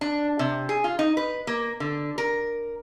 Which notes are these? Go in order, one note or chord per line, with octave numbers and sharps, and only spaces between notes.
D4
C3
G#4
F4
D#4
B4
A#3
D3
A#4